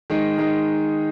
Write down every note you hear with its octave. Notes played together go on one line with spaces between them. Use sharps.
D#3 G#3 D#4
D#3 G#3 D#4